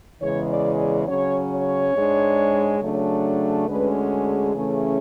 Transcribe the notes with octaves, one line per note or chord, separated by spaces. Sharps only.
E2 C#3 E3 G#3 C#5
D5
D5
C#3 F#3 C#4 C#5
C#5
G#2 G#3 D4
C#3 F#3 A3 D4
D2 D3 G#3 C#4 B4
G#4
C#3 E3 A3 C#4